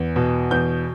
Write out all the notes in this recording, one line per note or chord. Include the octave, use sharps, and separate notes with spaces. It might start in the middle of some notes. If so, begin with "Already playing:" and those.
Already playing: E2
B2
E2 G6